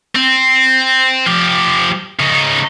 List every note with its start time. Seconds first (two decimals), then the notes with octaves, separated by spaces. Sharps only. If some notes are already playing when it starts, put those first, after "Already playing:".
0.16 C4
1.27 F3 G4
2.20 C#3 D#4